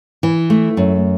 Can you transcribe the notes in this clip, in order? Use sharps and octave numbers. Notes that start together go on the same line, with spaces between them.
E3
A3
F#2